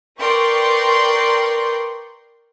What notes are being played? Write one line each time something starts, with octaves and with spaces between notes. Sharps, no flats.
A#4 B4 D5 G5 C6 C#6